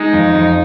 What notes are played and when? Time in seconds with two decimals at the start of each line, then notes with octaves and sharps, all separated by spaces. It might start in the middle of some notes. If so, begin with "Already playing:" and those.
Already playing: G#3 D#4
0.13 F2
0.35 F2